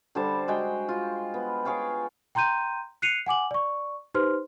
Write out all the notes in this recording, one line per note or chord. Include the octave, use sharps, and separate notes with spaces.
D3 G3 C5 A5
G#3 F#4 G5
F4
B3
G#4 C#5 F5 G5
G5 A#5 C6 G6 D#7
F#6 C7 C#7 D#7 F7
F#5 G#5 D6 F#7
D5 C#6
D#4 G4 B4 C5 C6 F6